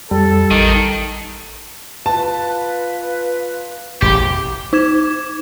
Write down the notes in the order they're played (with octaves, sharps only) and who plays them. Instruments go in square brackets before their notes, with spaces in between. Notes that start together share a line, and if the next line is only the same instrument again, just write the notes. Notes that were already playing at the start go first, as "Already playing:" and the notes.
[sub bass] F2 [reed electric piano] G3 [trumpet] A4
[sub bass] A1 [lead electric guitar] D#3
[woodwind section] F4 B4 [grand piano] A5
[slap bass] E1 A1 [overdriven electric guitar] G4
[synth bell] D#4 D6 G#6 E7